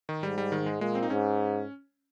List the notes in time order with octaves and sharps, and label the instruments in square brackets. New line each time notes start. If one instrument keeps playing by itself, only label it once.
[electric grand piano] D#3
[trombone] G#2 [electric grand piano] G3
[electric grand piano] G3
D#3
G#3
[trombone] A#2 [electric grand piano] G#3
[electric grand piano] C4
D#4
[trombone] G#2 [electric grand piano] C#4